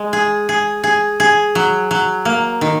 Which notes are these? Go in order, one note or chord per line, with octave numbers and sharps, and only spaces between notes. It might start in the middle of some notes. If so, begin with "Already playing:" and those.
Already playing: G#3
G#4
G#4
G#4
G#4
F#3
F#3
A#3
D#3